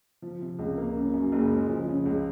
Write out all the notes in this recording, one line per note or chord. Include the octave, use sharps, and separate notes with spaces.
F3
C3
C#2
A#3
C#3
F#2
F#1
G#3
F3
C#3
C#2